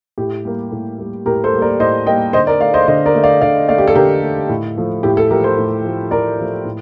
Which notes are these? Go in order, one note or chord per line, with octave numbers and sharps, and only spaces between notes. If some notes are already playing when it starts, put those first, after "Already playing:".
A2 G4
G3 A#3
A2
G3 A#3
A2 G4 A#4
A4 C5
G3 A#3
A#4 D5
A2 C5 D#5
G3 A#3 D#5 G5
D3 C5 D#5
A#4 D5
A3 D5 F5
C5 D#5
D3 C5 D#5
A#4 D5
A3
D5 F5
D3 D5 F5
A3 D5 F5
G4
A4
D3 G4 A#4
A3
A2
F3 A3
A2 G4
A4
F3 A3 G4 A#4
A4 C5
A2
F3 A3
A2 A#4 D5
F3 A3
A2